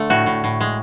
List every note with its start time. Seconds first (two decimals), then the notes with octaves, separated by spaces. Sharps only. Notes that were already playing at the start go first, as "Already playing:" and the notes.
Already playing: D3 A3 A4
0.10 A2 F#4
0.26 A2
0.44 A2
0.61 G#3